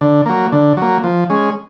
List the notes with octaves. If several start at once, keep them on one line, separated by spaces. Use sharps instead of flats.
D3
F#3 A#3
D3
F#3 A#3
F3
G#3 C#4